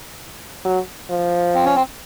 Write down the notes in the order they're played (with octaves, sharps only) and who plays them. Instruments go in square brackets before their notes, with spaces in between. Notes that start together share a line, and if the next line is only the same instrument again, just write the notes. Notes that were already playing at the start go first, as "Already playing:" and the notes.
[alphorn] F#3
F3
[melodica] C4
C#4
C4